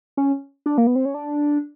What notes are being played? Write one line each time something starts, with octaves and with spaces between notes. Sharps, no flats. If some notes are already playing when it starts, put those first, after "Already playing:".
C#4
D4
A#3
B3
C4
C#4
D4